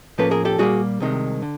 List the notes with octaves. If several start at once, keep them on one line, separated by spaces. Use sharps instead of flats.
A2 F3 A#3 C#4 A4 B4
G#4 A#4
G4 A4
A#2 G3 A#3 F#4 G#4
C2 C3 D#3 G#3
D3